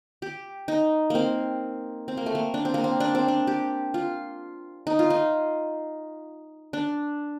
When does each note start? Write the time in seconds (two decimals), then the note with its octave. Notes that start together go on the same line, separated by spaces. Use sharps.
0.22 G4
0.68 D#4
1.10 A#3 C4
2.08 C4
2.17 A#3
2.26 A3
2.35 A#3
2.54 D4
2.65 C4
2.74 A#3
2.84 C4
3.00 D4
3.15 C4
3.28 D4
3.47 G4
3.94 F4
4.87 D#4
4.99 F4
5.10 D#4
6.73 D4